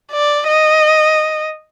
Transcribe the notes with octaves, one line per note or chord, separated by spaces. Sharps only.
D5
D#5